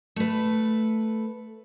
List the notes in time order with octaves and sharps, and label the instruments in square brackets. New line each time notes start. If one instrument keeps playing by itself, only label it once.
[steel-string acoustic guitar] A3 B4